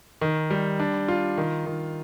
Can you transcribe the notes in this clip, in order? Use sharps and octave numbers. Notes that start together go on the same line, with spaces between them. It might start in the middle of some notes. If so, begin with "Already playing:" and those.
D#3
G3
D4
F4
D#3
D#3